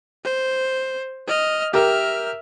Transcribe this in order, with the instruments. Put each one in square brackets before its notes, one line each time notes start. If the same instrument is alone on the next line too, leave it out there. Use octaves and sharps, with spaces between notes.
[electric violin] C5
D#5 F6
[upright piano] G4 A#4 [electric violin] E5 F6